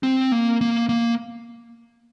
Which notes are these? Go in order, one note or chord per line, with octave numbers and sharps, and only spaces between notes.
C4
A#3
A#3
A#3